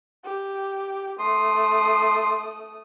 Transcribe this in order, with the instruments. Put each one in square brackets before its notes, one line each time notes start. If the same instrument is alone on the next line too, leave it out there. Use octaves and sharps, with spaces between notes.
[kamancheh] G4
[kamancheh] A3 D#6 [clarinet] C6